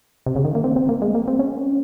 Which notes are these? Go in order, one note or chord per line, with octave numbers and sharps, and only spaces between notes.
C3
C#3
D#3
A#3
C4
C4
A#3
G#3
A#3
C4
C#4